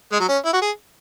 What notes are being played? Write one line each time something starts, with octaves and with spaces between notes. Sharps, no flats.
G#3
F#3
C#4
E4
F#4
G#4